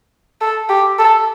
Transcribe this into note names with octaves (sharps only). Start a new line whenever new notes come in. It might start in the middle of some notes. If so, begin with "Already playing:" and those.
A4
G4
A4